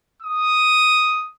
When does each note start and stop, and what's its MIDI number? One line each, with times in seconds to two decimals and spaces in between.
0.23 1.29 87